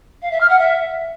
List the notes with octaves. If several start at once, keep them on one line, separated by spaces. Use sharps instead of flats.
F5
E5
F6
F#5
E5